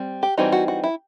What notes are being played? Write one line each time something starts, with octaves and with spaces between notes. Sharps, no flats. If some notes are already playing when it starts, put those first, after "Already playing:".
Already playing: G3 C4
G4
E3 G3 C4 D#4 F#4
F#4
F#4
E4